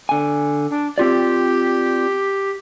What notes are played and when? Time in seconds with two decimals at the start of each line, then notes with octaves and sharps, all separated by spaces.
0.09 D3 G#5
0.70 D4
0.98 C4 F4 G4 D5